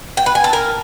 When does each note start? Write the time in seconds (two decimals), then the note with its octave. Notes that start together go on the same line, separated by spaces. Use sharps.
0.17 G5
0.26 B4
0.35 G#5
0.44 A4
0.53 A#4